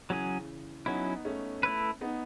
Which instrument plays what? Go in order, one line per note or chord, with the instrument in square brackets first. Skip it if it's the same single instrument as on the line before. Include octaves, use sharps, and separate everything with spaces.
[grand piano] C#3 E3 [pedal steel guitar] F#3 C#4 G#4
[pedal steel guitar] F#3 C#4 E4 [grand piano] B3 D#4
[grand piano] A3 C#4
[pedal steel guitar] A3 E4 B4
[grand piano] B3 D#4